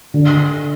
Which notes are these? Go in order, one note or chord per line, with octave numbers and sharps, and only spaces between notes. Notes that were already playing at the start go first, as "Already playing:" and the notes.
D3